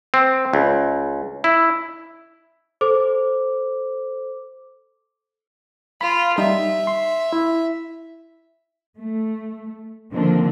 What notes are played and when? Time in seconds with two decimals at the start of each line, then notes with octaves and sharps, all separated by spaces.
0.14 C4
0.53 C#2
1.44 E4
2.81 A4 C5 D6
6.01 F4 B5
6.38 G3 D#4 E5
6.87 C6
7.33 E4
8.98 A3
10.13 D3 D#3 F3 A#3 C4 D4